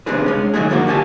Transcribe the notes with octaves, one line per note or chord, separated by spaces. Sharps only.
D#2 C3 D4 G#4 B4
G#3 C#4
D#3 F#3 G#3 A3 G#4
F2 D3 A#3 F#4
A#2 G4 G#5 A5